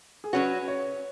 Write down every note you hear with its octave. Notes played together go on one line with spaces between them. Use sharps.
G#4
F#3 C#4 F#4 B4
C#5